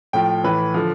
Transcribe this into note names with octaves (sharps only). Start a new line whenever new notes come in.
A2 F3 G5
A2 E3 B4
D3 F3